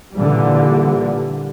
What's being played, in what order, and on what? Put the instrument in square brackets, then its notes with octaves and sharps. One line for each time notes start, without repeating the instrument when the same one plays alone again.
[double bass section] A#2 D3 E3 G3